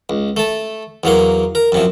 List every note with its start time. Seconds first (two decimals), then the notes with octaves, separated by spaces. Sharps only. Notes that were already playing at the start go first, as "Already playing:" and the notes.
0.10 C#2
0.37 A3 A5
1.04 E2 F#3 A#3 C6
1.55 A#4
1.72 F#2 C3 F3